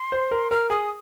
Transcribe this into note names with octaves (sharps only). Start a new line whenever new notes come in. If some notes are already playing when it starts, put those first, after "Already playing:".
Already playing: C6
C5
A#4
A#4 F6
G#4 D#6